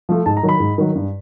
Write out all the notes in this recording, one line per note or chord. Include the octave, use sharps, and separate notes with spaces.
F3 A3
G#2 A5
A#5
D#3 F#3
B5
G#2
D#3 F#3
G2